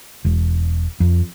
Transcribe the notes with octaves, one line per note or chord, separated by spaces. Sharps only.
E1
F2